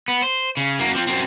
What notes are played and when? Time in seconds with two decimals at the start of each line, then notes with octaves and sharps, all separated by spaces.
0.08 B3
0.22 C5
0.57 C#3
0.79 F#2 A#3
0.95 F3 C4
1.07 F#2 C4